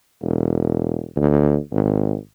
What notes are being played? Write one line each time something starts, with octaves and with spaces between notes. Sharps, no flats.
E1
D2
G#1